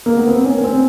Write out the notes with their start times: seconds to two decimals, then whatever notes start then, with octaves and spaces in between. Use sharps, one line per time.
0.06 A#3
0.17 B3
0.28 C4
0.46 C#4
0.64 C4